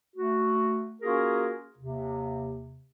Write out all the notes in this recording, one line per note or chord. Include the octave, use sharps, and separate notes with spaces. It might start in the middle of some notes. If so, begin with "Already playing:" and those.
A3 F#4
A#3 C#4 F4 F#4 G#4 A#4
D#2 C3